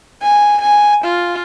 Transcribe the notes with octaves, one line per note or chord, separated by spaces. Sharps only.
G#5
G#5
F4